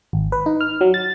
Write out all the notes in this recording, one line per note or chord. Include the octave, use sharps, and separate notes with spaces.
G#1
B4
D#4
F6
F#3
A6